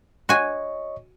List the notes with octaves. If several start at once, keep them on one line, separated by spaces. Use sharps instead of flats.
F#4 C#5 D#5 G#5 C#6